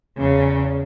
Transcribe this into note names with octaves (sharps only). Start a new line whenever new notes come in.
E2 C#3